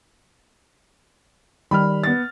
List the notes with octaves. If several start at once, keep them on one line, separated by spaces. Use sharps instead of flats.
D#3 G3 B5 F6
B3 A6